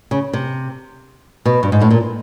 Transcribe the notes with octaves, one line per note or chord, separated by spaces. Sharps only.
C#3
C3
B2
G2
G#2
A2
A#2